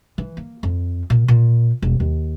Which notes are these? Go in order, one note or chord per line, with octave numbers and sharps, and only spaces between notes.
E3
A#3
F2
A#2
A#2
E1
D#2